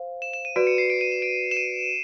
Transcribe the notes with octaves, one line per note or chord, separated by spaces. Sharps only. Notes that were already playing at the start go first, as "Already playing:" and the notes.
Already playing: C5 F5
E7
E7
D#7
F#4 B4 D5 D7
C#7
C7
D7
D#7
E7
D7
E7
D#7